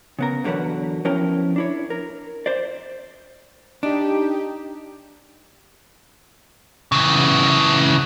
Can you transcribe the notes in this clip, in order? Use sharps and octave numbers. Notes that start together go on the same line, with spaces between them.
C#3 B3 A#4
E2 D3 F#3 A#4 B4 F#5
F3 B3 C#4 E4 A#4 G5
D4 E4 C#5
A#4
C5 D5
D4 D#4 G4
C#3 E3